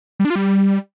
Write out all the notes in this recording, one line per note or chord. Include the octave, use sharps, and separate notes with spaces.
G3
D4
F4
G3